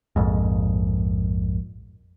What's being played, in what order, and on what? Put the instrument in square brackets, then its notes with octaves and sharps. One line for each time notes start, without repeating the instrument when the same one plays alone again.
[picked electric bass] A#1 F2 G#2